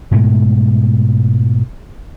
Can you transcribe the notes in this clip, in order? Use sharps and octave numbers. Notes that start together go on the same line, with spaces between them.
G#2 B2 G#3 A3